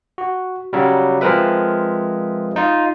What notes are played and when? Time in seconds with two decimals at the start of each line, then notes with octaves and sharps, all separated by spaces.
0.18 F#4
0.73 C#3 F#3 G3
1.21 F3 G#3 C4 A#4 B4 E5
2.56 D#4 F4